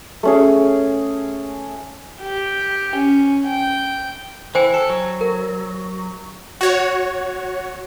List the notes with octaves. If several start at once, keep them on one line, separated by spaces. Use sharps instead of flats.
A3 C#4 G#4
G4
C#4
G5
E3 C5 G5 G#5
A4
F#3
A#4
F#4 C#5